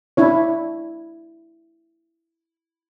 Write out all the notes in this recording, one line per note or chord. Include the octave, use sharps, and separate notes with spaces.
D4 E4 C#5